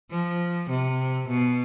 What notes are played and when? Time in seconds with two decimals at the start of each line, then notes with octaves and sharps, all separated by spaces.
0.11 F3
0.69 C3
1.28 B2